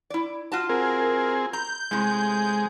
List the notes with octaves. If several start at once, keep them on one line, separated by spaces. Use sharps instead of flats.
E4 D5
F4 F#4 A5
C4 G#4 A#4
A#5 G6
A2 C3 G#3